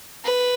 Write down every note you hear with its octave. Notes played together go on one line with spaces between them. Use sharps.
B4